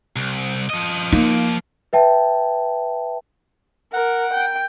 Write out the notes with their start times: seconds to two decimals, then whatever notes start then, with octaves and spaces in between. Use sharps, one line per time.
0.16 C2
0.70 F3 D#5
1.12 A#3 D#4
1.93 B4 E5 G5 A5
3.93 A#4 F#5
4.34 G5